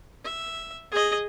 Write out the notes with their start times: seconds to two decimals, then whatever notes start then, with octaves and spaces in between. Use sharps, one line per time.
0.24 E5
0.91 G#4 D#5